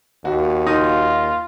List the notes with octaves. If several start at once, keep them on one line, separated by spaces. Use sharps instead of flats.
D#2 F#4
D#4 F4